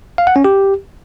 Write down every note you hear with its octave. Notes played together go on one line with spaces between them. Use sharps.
F5
F#5
C#4
G4